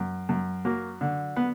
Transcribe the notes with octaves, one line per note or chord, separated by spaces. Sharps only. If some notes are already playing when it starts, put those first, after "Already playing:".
Already playing: F#2
F#2
F#3 A#3
D3
B3